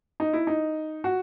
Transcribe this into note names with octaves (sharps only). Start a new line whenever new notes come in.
D#4
E4
D#4
F#4